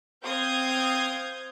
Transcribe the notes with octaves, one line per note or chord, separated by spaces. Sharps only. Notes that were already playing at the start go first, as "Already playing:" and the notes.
C4 F5 D#6 G6 G#6